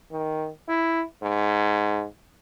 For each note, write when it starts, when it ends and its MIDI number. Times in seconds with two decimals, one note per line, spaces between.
0.12 0.49 51
0.68 1.02 64
1.22 2.05 44